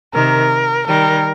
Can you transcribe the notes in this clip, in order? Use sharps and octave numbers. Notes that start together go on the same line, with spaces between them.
C3 D#3 A#4
D#3 G3 A#4